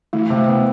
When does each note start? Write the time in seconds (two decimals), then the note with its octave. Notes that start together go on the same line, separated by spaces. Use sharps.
0.13 E3 A3
0.30 C3
0.37 A3
0.48 B3